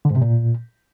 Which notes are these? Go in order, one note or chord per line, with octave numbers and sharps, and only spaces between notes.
D3
G#2
C3
A#2